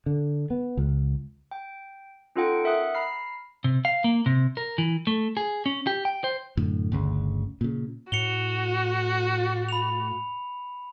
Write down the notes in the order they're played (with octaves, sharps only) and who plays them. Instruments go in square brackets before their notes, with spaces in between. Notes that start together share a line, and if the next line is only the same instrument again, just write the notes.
[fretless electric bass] D3
B3
C#2
[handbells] G5
C#4 D#4 F4 A4 F#5 G5
A#4 E5 F#5 D#6 F#6
A#5 B5 F6 C7
[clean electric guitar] C3
F5
A#3
C3
A#4
E3
A3
G#4
C#4
G4
G5
C5
[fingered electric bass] F#2 A2 D3
G1 D2 C#3
A#2 C#3
[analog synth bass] A2 [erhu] F#4 [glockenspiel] C#7 F7 G7
[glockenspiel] B5 F7